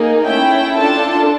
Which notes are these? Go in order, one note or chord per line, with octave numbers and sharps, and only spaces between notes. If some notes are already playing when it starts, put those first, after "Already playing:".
Already playing: A#3 D#4 G#4
A3 C#4 E4 G5
D4 F4 A4 A5